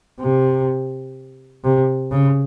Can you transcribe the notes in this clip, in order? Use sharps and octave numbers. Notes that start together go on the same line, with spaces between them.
C3
C3
C#3